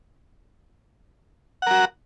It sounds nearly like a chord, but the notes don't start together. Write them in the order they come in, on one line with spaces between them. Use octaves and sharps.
F#5 A#4 F#4